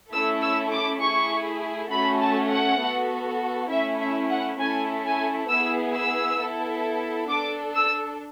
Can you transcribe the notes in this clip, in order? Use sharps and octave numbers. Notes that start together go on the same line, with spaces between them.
A3 C#4 E4 A4 E6
E6
D6
A3 E4 G#4 C#6
A3 C#4 F#4 A4 B5
A5
F#5
B3 F#4 A4
A3 C#4 E4 E5
E5
F#5
A3 C#4 E4 A4 G#5
G#5
B3 E4 G#4 E6
E6
B3 E4 A4
D4 A4 D6
E6